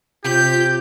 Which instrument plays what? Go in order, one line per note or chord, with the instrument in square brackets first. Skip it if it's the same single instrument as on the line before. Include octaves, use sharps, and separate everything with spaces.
[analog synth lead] C3 [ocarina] F4 [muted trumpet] G4 [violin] G6